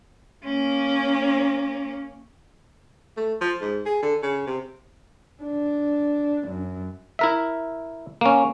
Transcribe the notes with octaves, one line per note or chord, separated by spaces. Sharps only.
A#3 C#4
A3
F3
G#2
G#4
D3
C#3
C3
D4
F#2
E4 A#4 E5
A#3 C#4